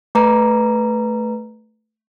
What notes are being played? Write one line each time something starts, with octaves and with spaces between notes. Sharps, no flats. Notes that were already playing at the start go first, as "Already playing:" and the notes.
A3 B4 A#5